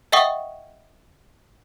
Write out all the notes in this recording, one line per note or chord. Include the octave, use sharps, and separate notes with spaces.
D#5 E5 F#5 G5 C#6 D#6